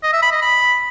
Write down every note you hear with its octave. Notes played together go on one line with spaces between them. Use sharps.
D#5
E5
B5
D#5
B5